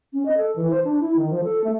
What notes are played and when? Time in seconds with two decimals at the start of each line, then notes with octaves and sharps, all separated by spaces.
0.13 C#4
0.26 D#5
0.37 A4
0.56 E3
0.71 C5
0.84 D4
1.00 E4
1.16 D#3
1.30 F3
1.44 A4
1.64 A3